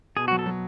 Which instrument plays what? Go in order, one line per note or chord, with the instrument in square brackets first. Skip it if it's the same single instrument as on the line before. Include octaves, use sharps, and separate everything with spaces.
[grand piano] B2 [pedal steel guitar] G#4
[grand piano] F#3 [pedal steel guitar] F#4
[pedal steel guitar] A4
[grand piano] F#3